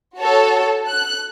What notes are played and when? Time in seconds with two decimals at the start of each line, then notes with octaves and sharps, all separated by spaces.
0.18 F#4 A4 C#5 A5
0.86 F#6